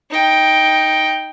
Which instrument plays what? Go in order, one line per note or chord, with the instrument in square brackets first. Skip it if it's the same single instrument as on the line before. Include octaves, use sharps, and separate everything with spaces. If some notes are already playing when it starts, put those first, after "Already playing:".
[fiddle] D#4 G5